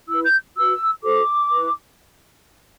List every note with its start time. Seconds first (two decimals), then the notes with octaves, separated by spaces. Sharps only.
0.08 E4 B4 E6
0.25 G6
0.56 F#4 B4 E6
1.03 F#4 A4 C5 D6
1.51 E4 B4